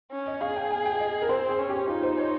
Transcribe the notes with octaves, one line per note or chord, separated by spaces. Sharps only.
C#4
D#5
G#4 F5
G5
G#5
G5
D#5
A#4
C4 C5
G#4
C#4
G4
D#4 F4
C5
C#5